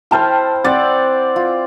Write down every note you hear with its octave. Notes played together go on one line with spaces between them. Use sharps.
E4 C5 G5 A5 F6
C4 D5 F#5 A6
F4